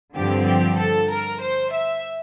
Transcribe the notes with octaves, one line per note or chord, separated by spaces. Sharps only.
G2 D3 F3 C4 G4
G4
A4
A#4
C5
E5